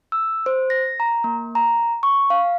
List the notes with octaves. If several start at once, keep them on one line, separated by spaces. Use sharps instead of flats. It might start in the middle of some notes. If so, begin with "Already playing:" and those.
E6
C5
A#6
A#5
A#3
A#5
C#6
F5